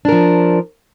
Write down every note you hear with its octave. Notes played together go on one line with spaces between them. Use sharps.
F3 D4 A#4